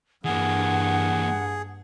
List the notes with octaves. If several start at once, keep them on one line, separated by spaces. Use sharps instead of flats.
G2 E3 A#3 G#4 F#5